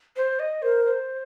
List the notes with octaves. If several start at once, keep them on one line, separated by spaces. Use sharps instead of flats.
C5
D#5
A#4 C5
C5